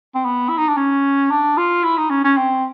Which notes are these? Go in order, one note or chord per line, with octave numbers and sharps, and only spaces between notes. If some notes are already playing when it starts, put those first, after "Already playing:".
C4
B3
E4
D#4
D4
C#4
D4
F4
E4
D#4
C#4
C#4
C4